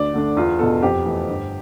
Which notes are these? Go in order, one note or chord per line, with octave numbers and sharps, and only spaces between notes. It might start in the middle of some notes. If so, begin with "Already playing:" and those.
Already playing: D2 D5
D3 A3 D4
E2 F4
B2 B3 A4
F2 G4
E3 A3
G1